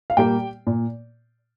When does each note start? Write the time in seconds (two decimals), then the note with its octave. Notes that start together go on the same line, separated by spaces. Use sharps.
0.10 F5
0.17 A#2 G3 A#3 G4 G5
0.67 A#2